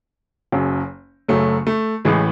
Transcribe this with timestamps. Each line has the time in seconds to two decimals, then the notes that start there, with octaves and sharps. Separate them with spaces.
0.52 F#1 F#2 C#3 F#3
1.28 F#1 F#2 C#3 F#3 A3
1.67 A3
2.05 A1 A2 E3 G#3